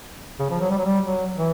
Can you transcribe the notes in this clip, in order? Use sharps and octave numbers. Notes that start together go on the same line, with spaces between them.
C#3
F3
F#3
G3
F#3
G3
F#3
E3